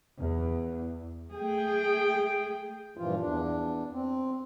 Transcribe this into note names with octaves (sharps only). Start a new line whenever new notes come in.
E2
A3 G#4 G5
G2 A#2 E3 F3 F4
E2 D4
C4